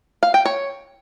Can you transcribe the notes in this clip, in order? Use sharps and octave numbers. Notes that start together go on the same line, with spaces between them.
F5
G5
C#5